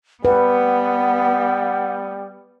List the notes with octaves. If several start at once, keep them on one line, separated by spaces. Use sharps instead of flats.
G3 B3 B4 F#5